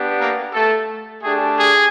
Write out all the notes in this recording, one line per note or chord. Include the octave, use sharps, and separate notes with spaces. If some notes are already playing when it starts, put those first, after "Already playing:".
Already playing: B3 D4 G4
A#3 A#4
A3 A4
A3 D4 G4 G#4
G#4